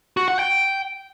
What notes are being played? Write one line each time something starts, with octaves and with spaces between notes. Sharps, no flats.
F#4
F#5
G5